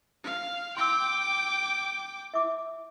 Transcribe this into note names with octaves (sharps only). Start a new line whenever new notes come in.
F5
G5 C6 D6 E6
E5 D6